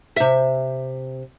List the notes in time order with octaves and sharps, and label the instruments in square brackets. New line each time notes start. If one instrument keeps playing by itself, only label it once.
[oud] C3 E5